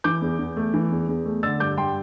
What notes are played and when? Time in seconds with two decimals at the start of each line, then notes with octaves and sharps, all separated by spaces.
0.04 E3 D6 G6
0.22 E2
0.39 E2
0.57 A3
0.74 E3
0.91 E2
1.09 E2
1.26 A3
1.43 D3 E6 A6
1.60 G2 D6 G6
1.78 G2 G5 C6